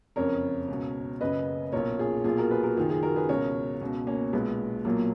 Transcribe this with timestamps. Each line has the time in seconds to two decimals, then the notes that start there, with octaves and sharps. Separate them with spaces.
0.16 F#1 F2 C#3 A#4 C#5
0.68 C#2 B2
1.21 F#1 F#2 C#3 B4 D#5
1.73 B1 A#2 A#4 C#5
1.99 F4 G#4
2.24 B1 A#2 F4 G#4
2.38 F#4 A#4
2.50 G#4 B4
2.63 F#4 A#4
2.76 F#1 F#2 D#3 F4 G#4
2.90 F4 G#4
3.03 F#4 A#4
3.16 G#4 B4
3.29 C#2 B2 A#4 C#5
3.82 C#2 B2
4.07 A#3 C#4
4.33 B1 A#2 G#3 B3
4.85 B1 A#2 F#3 A#3